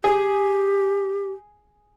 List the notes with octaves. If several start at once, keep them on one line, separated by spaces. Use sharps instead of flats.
G4 G#4